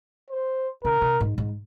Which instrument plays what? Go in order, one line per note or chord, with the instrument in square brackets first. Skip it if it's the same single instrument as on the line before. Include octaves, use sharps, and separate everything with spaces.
[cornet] C5
[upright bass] C#3 [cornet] A#4
[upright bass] C3
G#2
G#2